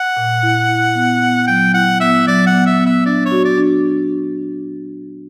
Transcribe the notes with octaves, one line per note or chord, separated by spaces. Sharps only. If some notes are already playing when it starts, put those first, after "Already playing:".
Already playing: F#5
A#2
E4
E4
B3
B3
F#3 G5
E4 F#5
B3 E5
F#3 D5
F#5
B3
E5
B3
E5
D4 D5
C#5
F#4
D5
D4